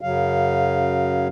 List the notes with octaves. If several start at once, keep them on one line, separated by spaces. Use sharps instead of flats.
F#2 C#3 F#3 F5